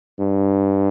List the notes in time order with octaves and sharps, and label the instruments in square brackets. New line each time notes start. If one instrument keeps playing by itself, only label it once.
[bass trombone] G2